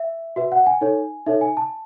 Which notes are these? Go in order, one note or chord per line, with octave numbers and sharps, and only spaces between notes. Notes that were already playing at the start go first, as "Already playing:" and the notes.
Already playing: E5
F#4 B4 E5
F#5
G#5
D#4 A4 C#5
D#4 A4 C#5 E5
G#5
A5